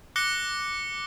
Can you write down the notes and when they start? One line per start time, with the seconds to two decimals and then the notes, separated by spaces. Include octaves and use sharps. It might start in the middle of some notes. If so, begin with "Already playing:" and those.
0.16 D6 F#6 A#6 C#7 G7